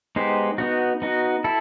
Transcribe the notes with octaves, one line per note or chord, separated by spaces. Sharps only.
G#3 B3 D#4 G4 C5
B3 D#4 F#4
B3 D#4 F#4
E4 A4